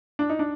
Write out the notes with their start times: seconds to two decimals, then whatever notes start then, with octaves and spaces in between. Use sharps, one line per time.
0.19 D4
0.29 D#4
0.39 D4